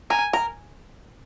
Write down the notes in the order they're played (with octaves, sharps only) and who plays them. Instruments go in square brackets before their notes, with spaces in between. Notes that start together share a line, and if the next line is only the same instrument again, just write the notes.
[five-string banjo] A#4 [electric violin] G#5
[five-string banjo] A#4